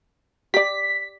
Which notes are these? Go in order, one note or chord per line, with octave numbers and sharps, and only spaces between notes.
G4 D5 B6